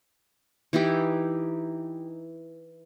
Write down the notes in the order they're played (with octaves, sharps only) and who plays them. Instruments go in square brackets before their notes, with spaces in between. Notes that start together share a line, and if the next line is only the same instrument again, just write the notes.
[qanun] E3 D#4 E4 G4